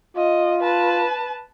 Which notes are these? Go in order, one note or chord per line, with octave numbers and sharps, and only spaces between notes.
F4 D#5
B4 A5